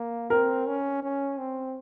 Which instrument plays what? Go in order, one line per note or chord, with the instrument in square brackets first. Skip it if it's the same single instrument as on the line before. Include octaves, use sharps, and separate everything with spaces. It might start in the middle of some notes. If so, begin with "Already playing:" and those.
Already playing: [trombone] A#3
[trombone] C4 [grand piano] A#4
[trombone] C#4
C#4
C4